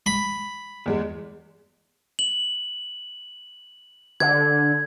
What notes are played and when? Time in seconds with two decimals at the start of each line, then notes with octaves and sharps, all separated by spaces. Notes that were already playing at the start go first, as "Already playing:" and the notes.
0.06 B5
0.86 E2 G#3
2.19 F#7
4.20 D3 G#6